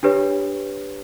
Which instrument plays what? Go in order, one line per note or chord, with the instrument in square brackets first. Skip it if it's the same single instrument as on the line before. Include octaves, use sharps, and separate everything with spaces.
[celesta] D4 G4 B4 C#5